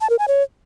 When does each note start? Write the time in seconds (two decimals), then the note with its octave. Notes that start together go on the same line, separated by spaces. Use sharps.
0.01 A5
0.10 A#4
0.19 G#5
0.28 C#5